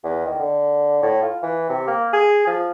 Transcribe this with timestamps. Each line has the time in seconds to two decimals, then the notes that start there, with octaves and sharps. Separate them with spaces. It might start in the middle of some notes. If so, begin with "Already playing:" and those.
0.04 E2
0.26 D#3
0.39 D3
1.02 A2
1.22 F4
1.43 E3
1.69 C3
1.87 A#3
2.13 G#4
2.47 F3